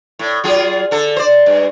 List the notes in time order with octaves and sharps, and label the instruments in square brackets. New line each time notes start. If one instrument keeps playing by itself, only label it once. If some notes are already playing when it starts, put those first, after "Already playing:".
[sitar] A2
F#3 F4 G#4
D3 A4
C5 D5
G2